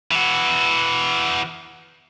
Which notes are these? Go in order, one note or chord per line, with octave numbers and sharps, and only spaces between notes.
E3 F#4